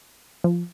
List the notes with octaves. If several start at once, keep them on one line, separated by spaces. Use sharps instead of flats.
F3